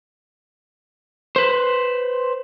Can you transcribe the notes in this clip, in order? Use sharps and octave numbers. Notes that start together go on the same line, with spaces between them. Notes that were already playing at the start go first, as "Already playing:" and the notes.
B4 C5